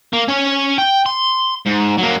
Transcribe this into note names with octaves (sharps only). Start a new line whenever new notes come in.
A#3
C#4 C#5
G5
C6
G#2
F#3 A#3